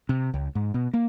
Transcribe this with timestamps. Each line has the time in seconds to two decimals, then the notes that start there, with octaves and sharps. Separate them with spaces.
0.09 C3
0.34 C#2
0.55 G#2
0.74 B2
0.94 A#3